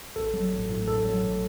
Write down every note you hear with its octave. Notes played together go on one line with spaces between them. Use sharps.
A1 A4
F#3
A1
A2
A1 A4
F#3
A1